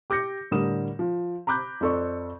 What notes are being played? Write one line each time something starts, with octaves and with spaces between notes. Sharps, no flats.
G4 D6 G6 A#6 C#7
A2 D3 G3 A#4 D#6 E7
F3
A#5 B5 D6 F#6 G6
F2 C4 A4 D5 C#6